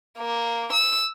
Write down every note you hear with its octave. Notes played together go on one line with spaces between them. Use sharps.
A#3
E6